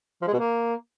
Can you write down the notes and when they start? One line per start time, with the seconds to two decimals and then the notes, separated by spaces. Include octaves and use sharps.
0.22 F3
0.28 G#3
0.33 B2
0.39 A#3